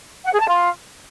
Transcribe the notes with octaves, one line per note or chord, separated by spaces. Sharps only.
F#5
G#4
A5
F4